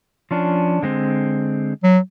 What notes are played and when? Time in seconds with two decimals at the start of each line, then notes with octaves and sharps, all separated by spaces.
0.31 F3 C#4 D4
0.83 D3 G#3 C4
1.83 F#3